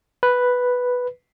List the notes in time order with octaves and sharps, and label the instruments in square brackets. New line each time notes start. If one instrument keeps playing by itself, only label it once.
[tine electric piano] B4